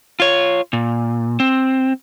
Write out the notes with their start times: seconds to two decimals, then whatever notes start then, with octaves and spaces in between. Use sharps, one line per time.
0.20 F4 C#5
0.73 A#2
1.40 C4